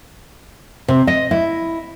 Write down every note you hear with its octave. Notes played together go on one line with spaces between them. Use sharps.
C3
D#5
E4